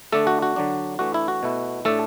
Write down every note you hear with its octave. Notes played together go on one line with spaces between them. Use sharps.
D3 A3 D4 A4
F#4
F#4
D3 F#3 D4
E3 A3 D4 F#4
E4
F#4
B2 A3 E4
A2 A3 D4 A4